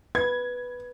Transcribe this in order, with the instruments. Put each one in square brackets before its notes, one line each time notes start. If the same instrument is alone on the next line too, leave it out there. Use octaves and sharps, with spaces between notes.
[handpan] B4 [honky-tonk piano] G#6